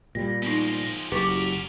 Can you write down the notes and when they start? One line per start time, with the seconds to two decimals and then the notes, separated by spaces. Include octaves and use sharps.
0.15 A#2 G3 A#6
0.42 F3 G#3 B3 D#4
1.12 F#1 F#4 G4 A#4 B4 C#6 D6